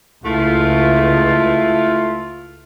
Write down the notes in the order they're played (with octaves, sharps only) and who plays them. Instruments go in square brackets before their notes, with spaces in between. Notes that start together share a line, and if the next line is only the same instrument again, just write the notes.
[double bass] C#2 [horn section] A3 E4 F4